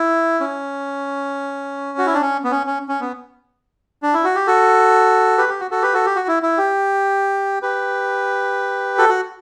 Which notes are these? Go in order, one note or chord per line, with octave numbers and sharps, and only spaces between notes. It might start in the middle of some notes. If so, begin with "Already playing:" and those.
Already playing: E4
C#4
F#4
E4
D4
C#4
B3
C#4
C#4
C#4
B3
D4
E4
F#4
G4
F#4 A4
G4 B4
G4
F#4
F#4 A4
G4 B4
F#4 A4
G4
F#4
E4
E4
G4
G4 B4
F#4 A4
F#4